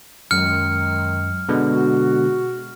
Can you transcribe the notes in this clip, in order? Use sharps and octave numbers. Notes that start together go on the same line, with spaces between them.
F#2 D#3 F#3 G#3 F6 C#7
B2 D3 G#3
F#4